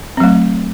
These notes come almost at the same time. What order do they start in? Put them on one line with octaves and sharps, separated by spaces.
C4 F#3 A3